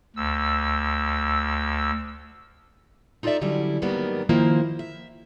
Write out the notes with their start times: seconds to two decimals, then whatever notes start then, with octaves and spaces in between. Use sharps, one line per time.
0.16 D2 E6
3.23 D#4 F4 A4 C5 D5 E5
3.42 D3 F#3 G3 C#4 E4
3.82 G#2 D#3 F#3 G3 A#3 B3
4.29 D#3 F3 A#3 E4 F4 C5
4.79 E5